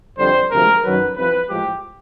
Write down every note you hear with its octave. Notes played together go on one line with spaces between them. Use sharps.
F2 D3 G3 C5
D2 C3 F3 G#3 A#4
F#2 D#3 F#3 B4
C2 C3 F3 B4
A2 F3 G#3 G4